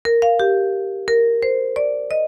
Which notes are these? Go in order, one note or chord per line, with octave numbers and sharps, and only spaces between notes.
A#4
F5
G4
A#4
C5
D5
D#5